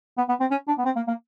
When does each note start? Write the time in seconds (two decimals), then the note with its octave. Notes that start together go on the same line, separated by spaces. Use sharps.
0.17 B3
0.29 B3
0.40 C4
0.51 C#4
0.68 D4
0.78 B3
0.85 C4
0.96 A#3
1.08 A#3